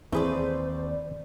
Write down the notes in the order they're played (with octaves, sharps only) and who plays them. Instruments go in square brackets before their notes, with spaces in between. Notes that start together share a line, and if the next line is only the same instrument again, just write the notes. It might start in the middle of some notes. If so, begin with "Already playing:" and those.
[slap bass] D#2 C4 [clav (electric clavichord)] E3 G#4 [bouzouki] A3 B4 D5 [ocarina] C5